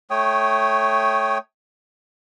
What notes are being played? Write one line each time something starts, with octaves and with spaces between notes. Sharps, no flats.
A3 C#5 G5 D#6